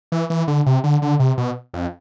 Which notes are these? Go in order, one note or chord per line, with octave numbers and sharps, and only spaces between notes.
E3
E3
D3
C3
D3
D3
C3
B2
F2